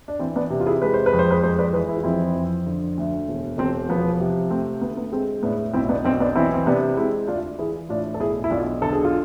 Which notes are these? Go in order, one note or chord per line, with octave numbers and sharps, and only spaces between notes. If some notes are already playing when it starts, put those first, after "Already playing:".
D4
E3 C4
B3 D4
C3
F4
E4 G#4
G#3 B4
C5
B4
F2
C5
G#4 B4
G#3 A4 C5
B4 D5
E3 G#4 B4
E4
F4
F2 C4 E4
F2
D3
D2
E1
E1 C4
F3 B3
C3
A3 C4
D2 B3
B3
G#3 C4
A2 B3 D4
B1 C4 E4
B3 D4
B1 C4
B3 D4
E3 C4 E4
C4
C3 B3 D4
G#3 C4 E4
D2 D4 F4
E3 E4 G#4
A2 D4 F4
A4
B1 E4 G#4
E4
B1 D4 F4
D3 A4
G#4
F4